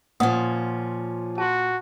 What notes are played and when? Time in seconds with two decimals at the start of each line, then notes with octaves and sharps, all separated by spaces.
0.20 A#2 F3 C#4 F#5 D#6
1.38 F#4 A5 C6